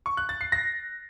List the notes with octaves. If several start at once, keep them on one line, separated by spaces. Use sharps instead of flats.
C#6
F#6
A6
C7
A#6